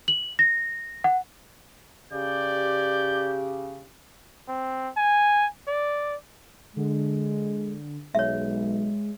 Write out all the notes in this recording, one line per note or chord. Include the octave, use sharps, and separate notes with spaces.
F#7
A#6
F#5
C#3 G4 D5 G6
C4
G#5
D5
D3 G#3
B1 G#3 C#5 E5